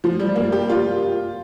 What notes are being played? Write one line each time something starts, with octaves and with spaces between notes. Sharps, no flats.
F3
G3
A#3
G4
F4